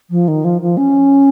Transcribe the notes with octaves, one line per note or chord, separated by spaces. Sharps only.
F3
D#3
F3
F3
C#4